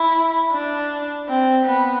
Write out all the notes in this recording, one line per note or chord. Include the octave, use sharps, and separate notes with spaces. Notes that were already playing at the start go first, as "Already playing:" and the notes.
Already playing: E4
D4
C4
B3